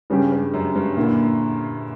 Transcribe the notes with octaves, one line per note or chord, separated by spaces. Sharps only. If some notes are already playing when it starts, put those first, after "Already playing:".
G2 C#3 G3 C#4 G4
G2
F#2
G2
A#2 D3 A#3 E4